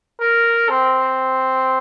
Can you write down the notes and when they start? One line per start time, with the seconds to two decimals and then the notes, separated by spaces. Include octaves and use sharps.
0.20 A#4
0.69 C4